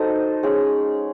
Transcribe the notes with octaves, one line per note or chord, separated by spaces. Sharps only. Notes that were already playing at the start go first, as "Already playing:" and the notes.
Already playing: D#4 F#4 A4 C5 D#5
G#3 C#4 G#4